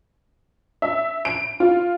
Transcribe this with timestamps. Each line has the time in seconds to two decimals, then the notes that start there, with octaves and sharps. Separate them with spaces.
0.82 E5
1.25 D7
1.60 F4